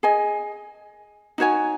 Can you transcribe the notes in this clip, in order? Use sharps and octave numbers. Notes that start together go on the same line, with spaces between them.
G#4 D#5 G#5
D#4 F#4 C#5 G#5